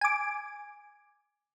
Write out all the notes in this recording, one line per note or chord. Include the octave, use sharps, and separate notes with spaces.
G#5 D6